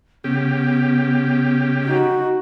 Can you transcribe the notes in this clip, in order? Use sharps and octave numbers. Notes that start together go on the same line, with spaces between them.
C#3 B3 G4
D#4 F#4